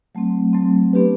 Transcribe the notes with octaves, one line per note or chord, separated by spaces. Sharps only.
F#3 A3 C4
F#3 A3 C4
B3 D4 G4 B4